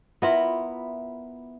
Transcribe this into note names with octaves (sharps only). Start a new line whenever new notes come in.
B3 E4 F4 A#4 E5 C6